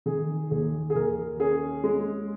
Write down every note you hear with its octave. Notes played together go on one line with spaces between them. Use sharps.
D#3 G#4
D#2 G#4
G#4
D#2 A#4
C#4 G#4
G#3